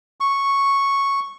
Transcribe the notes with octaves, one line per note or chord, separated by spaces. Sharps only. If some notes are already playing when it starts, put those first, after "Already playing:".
C#6